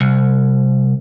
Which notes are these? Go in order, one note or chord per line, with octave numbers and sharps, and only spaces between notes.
C2